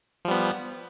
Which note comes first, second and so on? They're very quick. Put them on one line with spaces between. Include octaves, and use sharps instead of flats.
F3 G3 B3